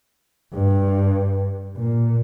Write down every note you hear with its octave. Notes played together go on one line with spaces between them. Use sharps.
G2
A#2